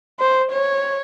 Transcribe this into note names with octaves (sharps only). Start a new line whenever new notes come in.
C5
C#5